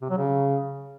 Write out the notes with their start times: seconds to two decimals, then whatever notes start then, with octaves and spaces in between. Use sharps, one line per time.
0.02 C3
0.10 F#3
0.18 C#3